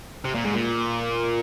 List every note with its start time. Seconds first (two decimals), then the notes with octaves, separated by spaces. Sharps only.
0.25 C3
0.35 A#2
0.44 G#2
0.53 A#2